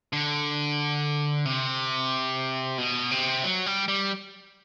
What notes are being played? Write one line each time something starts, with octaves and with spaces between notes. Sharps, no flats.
D3
C3
B2
C3
F#3
G3
G3